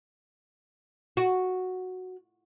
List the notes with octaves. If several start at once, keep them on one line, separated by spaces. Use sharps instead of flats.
F#4